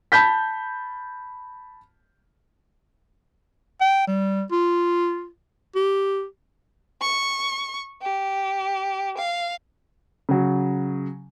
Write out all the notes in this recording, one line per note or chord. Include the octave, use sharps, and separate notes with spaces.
A5 B5 G6 B6
G5
G3
F4
G4
C#6
G4
F5
C#3 F#3